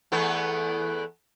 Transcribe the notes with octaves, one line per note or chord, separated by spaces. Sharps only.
E2 A3 B3